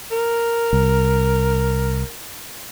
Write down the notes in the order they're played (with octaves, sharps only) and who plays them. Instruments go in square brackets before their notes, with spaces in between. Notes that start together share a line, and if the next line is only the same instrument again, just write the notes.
[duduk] A#4
[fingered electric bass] C2